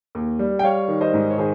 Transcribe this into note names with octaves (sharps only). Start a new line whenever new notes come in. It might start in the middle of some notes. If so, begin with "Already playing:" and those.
D#2
G3
G5
G3 C#5 F5
D#3
C5 D#5
G#2
C#5
D#3 G#4 C5